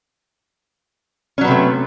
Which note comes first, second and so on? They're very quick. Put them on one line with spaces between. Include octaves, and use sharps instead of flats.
C#4 F#3 B3 C3 A3